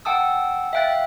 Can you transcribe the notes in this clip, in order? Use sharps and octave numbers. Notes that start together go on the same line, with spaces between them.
F#5 G5 A5 D#6 E6
E5 F5 G5 F#6 A6